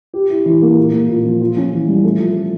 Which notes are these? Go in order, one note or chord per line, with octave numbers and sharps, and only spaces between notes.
G4
E4
E3
A#3
A#2
A#3
A#2
F3
F4
C#4
E3
G3
A3
F3